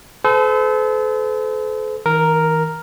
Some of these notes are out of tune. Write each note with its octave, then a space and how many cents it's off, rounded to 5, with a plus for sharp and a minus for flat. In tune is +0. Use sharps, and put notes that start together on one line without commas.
A4 -35 C5 -45
D#3 +45 A#4 +0